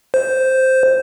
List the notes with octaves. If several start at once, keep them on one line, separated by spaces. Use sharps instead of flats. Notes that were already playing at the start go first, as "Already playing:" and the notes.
C5